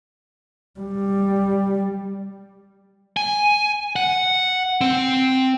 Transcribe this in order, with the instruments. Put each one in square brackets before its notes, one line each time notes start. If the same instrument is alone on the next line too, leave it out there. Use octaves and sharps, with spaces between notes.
[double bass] G3
[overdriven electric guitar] G#5
F#5
C4